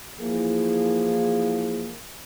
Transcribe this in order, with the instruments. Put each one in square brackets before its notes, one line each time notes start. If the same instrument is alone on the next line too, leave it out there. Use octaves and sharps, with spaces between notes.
[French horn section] E3 F3 A#3 E4 G#4